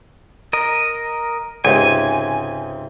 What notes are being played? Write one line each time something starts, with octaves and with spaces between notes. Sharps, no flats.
A#4 D#5
C#2 G#2 C3 G#5